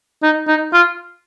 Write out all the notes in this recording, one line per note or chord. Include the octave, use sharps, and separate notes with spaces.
D#4
D#4
F4